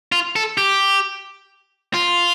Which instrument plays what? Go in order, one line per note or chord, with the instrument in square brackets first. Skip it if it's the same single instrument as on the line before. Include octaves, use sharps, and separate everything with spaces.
[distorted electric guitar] F4
A4
G4
F4